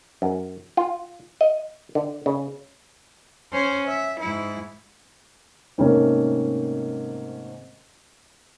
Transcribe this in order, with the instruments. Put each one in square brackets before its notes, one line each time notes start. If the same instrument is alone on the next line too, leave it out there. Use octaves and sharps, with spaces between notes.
[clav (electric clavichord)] F#2
F4
D#5
D3
C#3
[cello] C#4 C5
E5
G#2 E4
[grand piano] G#2 C3 D#3 A3 A#3 C#4